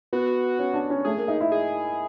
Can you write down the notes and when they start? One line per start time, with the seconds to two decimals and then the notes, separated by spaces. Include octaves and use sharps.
0.13 B3 F#4
0.59 C#4
0.74 D4
0.90 C#4
1.05 A3 G#4
1.17 A#3
1.28 D#4
1.40 E4
1.52 G#4